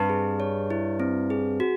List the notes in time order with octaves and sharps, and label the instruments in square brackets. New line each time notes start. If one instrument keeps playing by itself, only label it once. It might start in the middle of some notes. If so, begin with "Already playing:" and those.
Already playing: [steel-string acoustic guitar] G2 [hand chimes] C4
[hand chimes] G#4
C#5
E4
C4
G#4
F#4